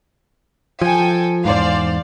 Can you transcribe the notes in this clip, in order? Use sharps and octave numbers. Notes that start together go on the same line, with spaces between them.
F3 A4 G5 G#5
E2 G#2 C5 D5 F5